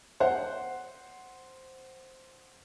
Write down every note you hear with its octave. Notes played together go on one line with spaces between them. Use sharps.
C5 F#5